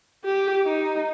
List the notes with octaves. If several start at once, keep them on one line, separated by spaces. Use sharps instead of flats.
G4
D#4